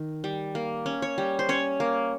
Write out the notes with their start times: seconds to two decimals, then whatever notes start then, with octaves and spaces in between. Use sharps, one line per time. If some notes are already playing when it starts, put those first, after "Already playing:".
Already playing: D#3
0.24 G3
0.55 A#3
0.86 C#4
1.02 C#5
1.18 G3
1.39 C5
1.49 C#4 C#5
1.80 A#3